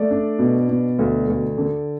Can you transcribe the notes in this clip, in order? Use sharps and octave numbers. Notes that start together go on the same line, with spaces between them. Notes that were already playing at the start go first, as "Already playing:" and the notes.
Already playing: A3 D5
D4
B2
B2
D2
D2
D3